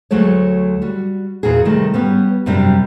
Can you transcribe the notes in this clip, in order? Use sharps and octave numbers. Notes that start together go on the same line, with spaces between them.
D2 F#3 G#3 A3 C#5
G3 F#4
E2 A#2 F#4 G#4
C3 D#3 G3 A3
G3 B3 C#4
F#2 C3 G3 C4 D4